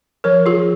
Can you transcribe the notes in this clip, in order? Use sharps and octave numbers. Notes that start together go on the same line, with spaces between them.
F3 A#4 C#5
F4 G#4
F3